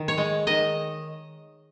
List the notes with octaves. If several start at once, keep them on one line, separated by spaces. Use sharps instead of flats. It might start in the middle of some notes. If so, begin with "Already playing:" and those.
Already playing: D#3
C#5
G#3
D#3 D#5